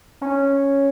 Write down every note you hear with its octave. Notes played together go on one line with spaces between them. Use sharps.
C#4